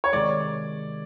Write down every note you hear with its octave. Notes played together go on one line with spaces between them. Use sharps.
C#5
C3 D#3 G#3 D5